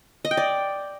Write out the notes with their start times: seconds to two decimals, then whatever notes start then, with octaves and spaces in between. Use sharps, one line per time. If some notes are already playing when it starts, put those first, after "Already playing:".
0.25 D#5
0.31 G5
0.37 D5